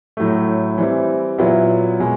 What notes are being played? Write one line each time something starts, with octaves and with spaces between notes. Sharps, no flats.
A2 F#3 A3
E3 G3 C4 E4
A#2 F#3 B3 E4
B2 G#3